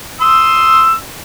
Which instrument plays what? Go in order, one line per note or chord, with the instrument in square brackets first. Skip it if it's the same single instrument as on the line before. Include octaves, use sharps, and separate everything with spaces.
[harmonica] C6 D#6 E6